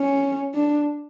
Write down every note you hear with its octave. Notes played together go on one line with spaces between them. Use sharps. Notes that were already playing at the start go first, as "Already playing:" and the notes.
Already playing: C#4
D4